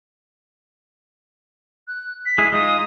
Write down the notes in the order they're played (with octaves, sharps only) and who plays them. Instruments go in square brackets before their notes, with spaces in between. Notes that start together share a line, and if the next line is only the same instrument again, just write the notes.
[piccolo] F#6
B6
[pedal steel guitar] G#3 E4 G#4
[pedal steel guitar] G#3 D#4 F4 [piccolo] D#6